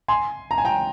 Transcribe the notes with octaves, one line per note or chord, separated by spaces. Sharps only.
G#5 C6
A#5
G#5
G5 A#5